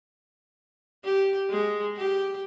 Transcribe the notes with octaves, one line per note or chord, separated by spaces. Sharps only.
G4
G#3
G4